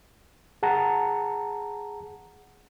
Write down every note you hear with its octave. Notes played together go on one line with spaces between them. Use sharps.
G#4 F#5 A5 A#5